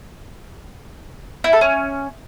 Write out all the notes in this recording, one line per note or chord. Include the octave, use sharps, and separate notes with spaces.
E4
A4
C#4